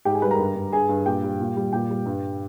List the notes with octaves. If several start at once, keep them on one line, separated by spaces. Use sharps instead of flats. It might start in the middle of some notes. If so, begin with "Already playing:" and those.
G#2 G4 G5
G#4 G#5
G3 B4 B5
A#4 A#5
G2
G2
G2 G#4 G#5
G2
A#2 G4 G5
G3
A#2
G3
A#2 G4 G5
G3
G2